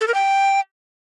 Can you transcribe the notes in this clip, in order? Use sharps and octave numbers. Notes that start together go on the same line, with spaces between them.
A4
A#4
G5